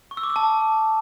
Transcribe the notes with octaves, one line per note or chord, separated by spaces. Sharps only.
C#6
E6
D6
E6
A5